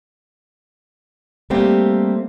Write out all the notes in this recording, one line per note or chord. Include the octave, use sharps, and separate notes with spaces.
G3 A3 A#3 C4 G4